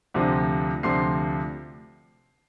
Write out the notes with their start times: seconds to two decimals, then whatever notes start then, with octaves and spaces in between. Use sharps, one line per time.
0.14 D2 C3 F3
0.83 D2 C3 F3 C6 C7